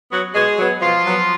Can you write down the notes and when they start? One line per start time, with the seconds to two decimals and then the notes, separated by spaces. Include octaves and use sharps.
0.10 F#3 B3
0.33 B2 G#3 G#4
0.57 F#3 B3
0.81 B2 F3 F4
1.06 F#3 B3